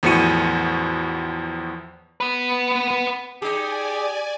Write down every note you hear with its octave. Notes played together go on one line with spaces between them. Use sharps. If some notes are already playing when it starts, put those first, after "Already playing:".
E2 A2 F3 F#4 C#7 D#7
B3 B4
D#4 G4 G#4 D5 G#5